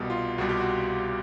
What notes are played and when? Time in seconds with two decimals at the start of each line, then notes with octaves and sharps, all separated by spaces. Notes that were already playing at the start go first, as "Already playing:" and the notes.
Already playing: C2 B2 G3
0.10 F4
0.38 C2 B2 G3 F#4
0.49 G4
0.60 F#4